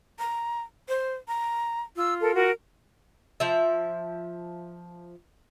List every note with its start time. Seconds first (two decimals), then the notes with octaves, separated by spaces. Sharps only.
0.19 A#5
0.89 C5
1.28 A#5
1.96 F4 E6
2.20 A4 A#4
2.34 F#4 A#4
3.40 F3 E5